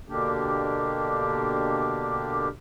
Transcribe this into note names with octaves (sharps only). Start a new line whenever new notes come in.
B2 D3 A#3 D4 G4